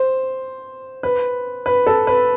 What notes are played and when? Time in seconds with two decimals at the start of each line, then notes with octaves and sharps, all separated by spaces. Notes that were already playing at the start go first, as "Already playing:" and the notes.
Already playing: C5
1.03 B4
1.66 B4
1.86 A4
2.07 B4